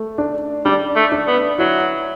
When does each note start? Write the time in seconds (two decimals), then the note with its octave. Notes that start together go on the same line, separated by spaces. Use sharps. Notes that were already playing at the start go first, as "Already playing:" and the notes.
Already playing: A3
0.18 D4
0.65 G3 D4
0.96 A3
1.12 D4
1.27 B3
1.58 F#3 E4